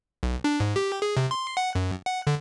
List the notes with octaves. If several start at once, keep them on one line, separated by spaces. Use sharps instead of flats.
B1
D4
G#2
G4
G#4
C3
C6
F#5
F#2
F#5
D3